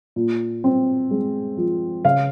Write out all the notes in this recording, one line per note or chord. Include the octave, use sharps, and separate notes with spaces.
A#2
C4
G#3
F3
C#3 F5